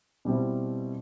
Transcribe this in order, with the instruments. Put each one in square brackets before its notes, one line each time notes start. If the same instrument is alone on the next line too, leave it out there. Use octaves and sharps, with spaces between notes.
[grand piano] B2 G3 C4 E4